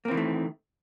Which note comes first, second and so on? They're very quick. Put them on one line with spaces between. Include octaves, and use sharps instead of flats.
A#3 C4 E3 D#3 A3